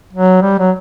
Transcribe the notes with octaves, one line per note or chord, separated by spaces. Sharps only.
F#3
G3
F#3